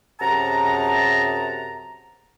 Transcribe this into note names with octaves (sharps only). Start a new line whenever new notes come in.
F#2 C3 G#4 F#5 A5 A#5